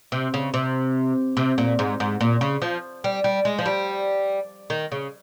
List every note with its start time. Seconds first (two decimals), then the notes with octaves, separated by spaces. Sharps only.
0.12 C3
0.34 C#3
0.54 C3
1.37 C3
1.58 A#2
1.79 G#2
2.00 G#2
2.21 A#2
2.41 C#3
2.62 F3
3.04 G3
3.24 G3
3.45 G#3
3.58 F3
3.66 G3
4.70 D#3
4.92 C#3